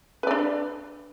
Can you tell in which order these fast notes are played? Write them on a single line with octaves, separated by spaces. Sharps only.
B4 D5 D4